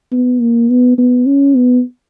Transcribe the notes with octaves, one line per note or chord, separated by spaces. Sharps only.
B3
A#3
B3
B3
C#4
B3